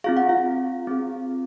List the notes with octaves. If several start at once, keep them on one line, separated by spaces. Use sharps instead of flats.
C4 F4 G#4 F5
F#5
F4 F5
C4 F4 G#4